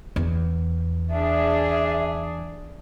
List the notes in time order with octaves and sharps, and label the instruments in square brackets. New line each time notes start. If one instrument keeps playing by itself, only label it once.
[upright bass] E2
[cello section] D4 G#4 [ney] E5